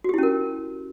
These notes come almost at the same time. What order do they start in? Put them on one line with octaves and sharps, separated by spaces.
F#4 G4 E4 C#4 A#4